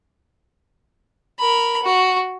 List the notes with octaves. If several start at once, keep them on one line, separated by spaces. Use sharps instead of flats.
A#4 B5
F#4